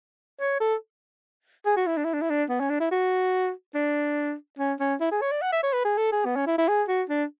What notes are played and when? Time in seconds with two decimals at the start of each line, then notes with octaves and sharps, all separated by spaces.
0.40 C#5
0.60 A4
1.66 G#4
1.77 F#4
1.87 E4
1.97 D4
2.05 E4
2.13 D4
2.21 E4
2.30 D4
2.49 B3
2.60 C#4
2.70 D4
2.80 E4
2.91 F#4
3.75 D4
4.59 C#4
4.80 C#4
5.00 E4
5.11 G#4
5.21 C#5
5.32 D5
5.42 F#5
5.52 E5
5.63 C#5
5.73 B4
5.85 G#4
5.97 A4
6.12 G#4
6.25 B3
6.36 C#4
6.47 E4
6.58 E4
6.68 G#4
6.88 F#4
7.09 D4